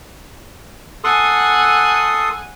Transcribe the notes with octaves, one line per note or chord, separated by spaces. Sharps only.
A4 F#5 G#5 C6 D#6